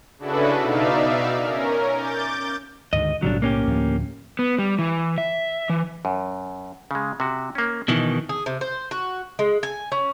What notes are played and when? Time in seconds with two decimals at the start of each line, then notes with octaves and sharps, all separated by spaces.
0.19 C#3 D4 E4 F#4 A4 B4
0.60 B2 D#4 D5 E5 F5
1.43 C#4 A#4
1.96 D6 G6 A6
2.93 D2 G#2 D#3 D#5
3.22 B1 A2 C#3 F#3 G3 D4
3.42 A#3 C#4 G4
3.68 D2 A2 F3
4.39 B3
4.59 G3
4.79 E3
5.18 E5
5.70 E3
6.05 F#2
6.91 C#3 G#3
7.20 C3 F#4
7.55 A#3 C#4
7.88 B2 D#3 E3 E4
8.29 G#4
8.46 C3
8.61 C5
8.91 F#4
9.39 G#3
9.63 G#5
9.92 C#4